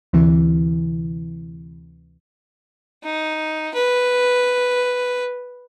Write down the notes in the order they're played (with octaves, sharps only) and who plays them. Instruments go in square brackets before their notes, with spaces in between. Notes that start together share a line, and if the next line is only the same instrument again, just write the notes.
[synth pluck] D2 C3 E3
[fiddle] D#4
B4